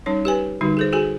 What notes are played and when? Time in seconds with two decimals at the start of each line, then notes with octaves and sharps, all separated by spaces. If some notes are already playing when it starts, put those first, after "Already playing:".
0.06 G3 C#4 D#4 C#5
0.25 G4 B4 G#5
0.61 D3 G3 D#4 F#4
0.77 G#4 A4 C5
0.92 F#4 G#4 A4 G#5